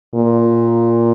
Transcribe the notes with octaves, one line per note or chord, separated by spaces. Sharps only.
A#2